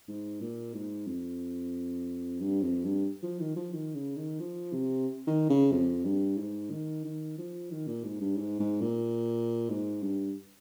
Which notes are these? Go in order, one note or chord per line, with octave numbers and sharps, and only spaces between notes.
G#2
A#2
G#2
F2
G2
F2
G2
F3
D#3
F3
D#3
C#3
D#3
F3
C3
D#3
C#3
F2
G2
G#2
D#3
D#3
F3
D#3
A#2
G#2
G2
G#2
G#2
A#2
G#2
G2